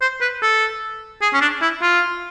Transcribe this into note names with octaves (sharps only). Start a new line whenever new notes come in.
C5
B4
A4
G#4
C#4
D4
E4
F4